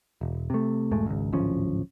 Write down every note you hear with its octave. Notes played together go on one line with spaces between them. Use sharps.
E1
C3 A3
E1 G#2 G#3 A3
G#1 C#2
D1 G#1 F3 C#4